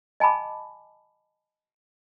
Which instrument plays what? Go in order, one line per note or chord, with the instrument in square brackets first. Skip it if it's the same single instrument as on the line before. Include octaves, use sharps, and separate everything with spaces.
[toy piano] D#5 G#5 A5 B5 D6